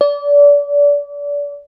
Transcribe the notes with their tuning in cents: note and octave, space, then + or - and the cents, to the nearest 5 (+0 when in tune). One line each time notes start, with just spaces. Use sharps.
D5 -30